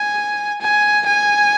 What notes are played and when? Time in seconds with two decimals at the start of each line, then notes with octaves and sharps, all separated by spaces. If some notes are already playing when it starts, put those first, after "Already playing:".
Already playing: G#5
0.61 G#5
1.07 G#5